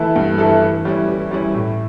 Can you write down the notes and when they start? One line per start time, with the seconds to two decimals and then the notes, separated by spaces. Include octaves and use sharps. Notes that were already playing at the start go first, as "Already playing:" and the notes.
Already playing: E3 A3 E4 A4
0.16 G2
0.38 E3 A3 E4 A4
0.62 E3
0.85 G3 C#4 E4
1.09 E3
1.31 G3 C#4 E4
1.54 A2